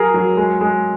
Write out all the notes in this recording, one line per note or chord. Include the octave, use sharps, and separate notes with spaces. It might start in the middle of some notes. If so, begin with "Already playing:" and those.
Already playing: F#3 G#4 A#4
F#3
G#3
G#3